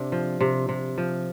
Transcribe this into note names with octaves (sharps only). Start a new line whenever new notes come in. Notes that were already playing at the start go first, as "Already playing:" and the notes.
Already playing: C3 D4
F3
C3
C3
F3